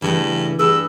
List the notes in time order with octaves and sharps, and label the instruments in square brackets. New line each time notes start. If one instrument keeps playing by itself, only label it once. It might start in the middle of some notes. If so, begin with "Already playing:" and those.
[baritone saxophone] G2 [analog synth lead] C#3 [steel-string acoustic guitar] E3 A3
[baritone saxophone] G2 [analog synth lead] G#4 [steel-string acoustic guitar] B4 [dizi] E6